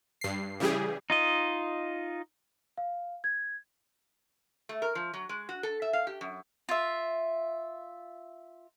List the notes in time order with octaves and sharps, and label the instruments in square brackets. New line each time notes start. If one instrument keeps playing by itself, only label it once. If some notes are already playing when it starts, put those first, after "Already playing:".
[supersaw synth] G2 C7
C#3 E3 G3 G4 G#4
[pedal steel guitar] D#4 F4 D#5
[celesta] F5
G#6
[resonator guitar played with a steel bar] A3
A#4
F3
F#3
G#3
F#4
A4
E5
F5
G4
F#2
[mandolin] F4 E5